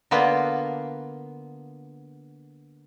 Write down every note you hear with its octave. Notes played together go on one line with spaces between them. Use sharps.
D3 A#3 B3 F4